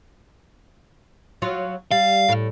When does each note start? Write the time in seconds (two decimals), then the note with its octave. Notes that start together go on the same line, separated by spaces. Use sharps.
1.42 F#3 F4
1.91 G3 F5
2.28 A2